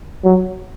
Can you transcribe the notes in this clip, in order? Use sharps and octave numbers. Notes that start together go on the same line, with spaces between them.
F#3